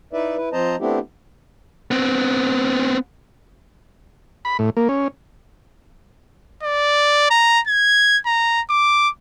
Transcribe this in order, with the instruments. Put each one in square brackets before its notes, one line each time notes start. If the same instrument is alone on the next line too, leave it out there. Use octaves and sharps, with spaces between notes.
[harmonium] D#4 E4 B4 D5 E5
E4 B4
F3 C4 C5 D#5 A5 A#5
A3 B3 C4 D4 E4 G4
[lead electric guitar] B3 C4
[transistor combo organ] B5
A2
A#3
C#4
[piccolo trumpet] D5
A#5
G#6
A#5
D6